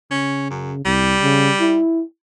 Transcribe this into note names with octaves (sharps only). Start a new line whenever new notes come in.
C#3 C#4
F#2
C2 G3
C#3
E4